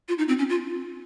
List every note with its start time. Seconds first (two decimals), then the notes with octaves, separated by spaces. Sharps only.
0.08 F4
0.18 D#4
0.28 C4
0.39 C#4
0.49 F4